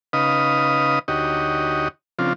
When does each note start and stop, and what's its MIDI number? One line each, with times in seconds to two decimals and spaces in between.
0.13 0.99 49
0.13 0.99 63
0.13 0.99 71
0.13 0.99 75
0.13 0.99 77
0.13 0.99 87
1.08 1.88 38
1.08 1.88 63
1.08 1.88 66
1.08 1.88 67
1.08 1.88 73
1.08 1.88 75
2.19 2.33 49
2.19 2.33 53
2.19 2.33 60
2.19 2.33 62
2.19 2.33 65